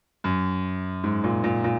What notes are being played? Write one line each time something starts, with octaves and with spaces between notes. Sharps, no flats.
F#2
G#2
A#2
A#2
A#2